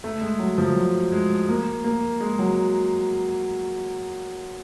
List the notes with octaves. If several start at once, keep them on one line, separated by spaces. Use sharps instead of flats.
A3
G#3
F#3
F3
F#3
G#3
A#3
A#3
G#3
F#3